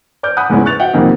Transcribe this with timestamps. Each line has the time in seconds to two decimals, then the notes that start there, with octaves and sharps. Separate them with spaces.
0.23 D5 D6 F6 G6
0.37 F#5 B5 D#6 F#6 G6
0.49 E2 G#2 C#3 B3 C#4 E4
0.65 C#6 F#6 A6 F7
0.80 F#4 E5 F#5 G5
0.93 F2 C3 D#3 F#3 A#3 D#4